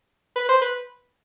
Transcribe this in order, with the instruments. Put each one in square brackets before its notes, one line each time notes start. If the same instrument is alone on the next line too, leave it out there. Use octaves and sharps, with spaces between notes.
[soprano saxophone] B4
C5
B4